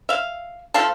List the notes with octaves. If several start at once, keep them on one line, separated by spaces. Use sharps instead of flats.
E5 F5
F3 A3 F5 A5